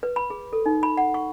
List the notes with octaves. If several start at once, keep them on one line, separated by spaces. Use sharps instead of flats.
B4
B5
G#4
A4
D#4
B5
F#5
C#6